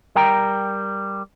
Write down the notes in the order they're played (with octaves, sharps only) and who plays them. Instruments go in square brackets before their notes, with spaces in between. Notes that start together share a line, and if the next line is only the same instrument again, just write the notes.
[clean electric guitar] G3 A#4 G5 A#5